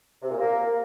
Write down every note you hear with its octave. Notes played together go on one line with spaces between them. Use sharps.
C3
A#2
A#3